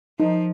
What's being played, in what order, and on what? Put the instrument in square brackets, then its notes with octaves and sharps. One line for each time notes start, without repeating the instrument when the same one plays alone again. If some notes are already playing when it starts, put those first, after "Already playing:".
[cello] F3 [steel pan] D#4